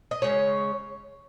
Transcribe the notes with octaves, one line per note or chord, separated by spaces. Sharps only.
D#5
C#3 G#3 C#4 C#5